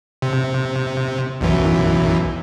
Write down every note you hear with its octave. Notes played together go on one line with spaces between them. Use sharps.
C3
B1 F#2 E3